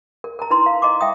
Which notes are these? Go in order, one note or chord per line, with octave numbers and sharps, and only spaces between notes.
A#4
A#4 A5 A#5
D#4 E4 B4 A#5 C6
F5
D#5 A#5 C6 D6
E5 G5 D#6